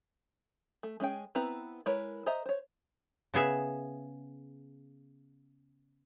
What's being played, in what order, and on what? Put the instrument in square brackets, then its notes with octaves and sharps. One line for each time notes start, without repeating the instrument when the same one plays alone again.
[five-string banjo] A3
G#3 C#4 G#4 G5
B3 C4 E4 B4 A#5
G#3 E4 A#4 B4 C#5
C5 D#5 E5 A#5
C5 C#5
[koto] C#3 B3 G#4 E5